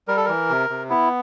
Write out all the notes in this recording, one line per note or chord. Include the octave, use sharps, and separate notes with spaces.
G3 A#4
A4
E3 A#4
C3
C3
B3 E4